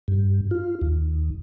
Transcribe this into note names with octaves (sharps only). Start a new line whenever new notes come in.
G2
F4
D#2